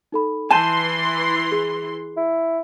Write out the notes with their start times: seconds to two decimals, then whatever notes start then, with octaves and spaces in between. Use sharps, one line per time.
0.12 D#4 A4 B5
0.51 E3 G#5 A5 C6 G6 D#7 E7
1.52 G#4
2.17 E4